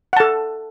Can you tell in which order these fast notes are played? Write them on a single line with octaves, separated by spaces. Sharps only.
F#5 A5 A4